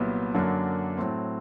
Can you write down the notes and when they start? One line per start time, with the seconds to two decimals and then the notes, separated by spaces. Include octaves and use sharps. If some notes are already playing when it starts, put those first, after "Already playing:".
Already playing: C2 A#2 F#3 B3
0.34 F#2 D3 F#3 A#3 D4
0.97 A2 F#3 A3 C4